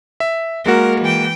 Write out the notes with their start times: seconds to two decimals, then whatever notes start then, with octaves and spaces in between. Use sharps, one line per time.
0.20 E5
0.66 G#3 A#3 F#4 A#4
1.01 E3 G5